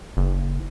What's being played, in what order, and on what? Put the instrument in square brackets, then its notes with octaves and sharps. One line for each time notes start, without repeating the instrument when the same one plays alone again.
[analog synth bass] F#1